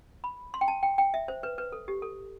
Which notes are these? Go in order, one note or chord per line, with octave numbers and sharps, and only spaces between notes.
B5
C6
G5
A5
G5
G5
E5
C5
B4
B4
A4
G4
A4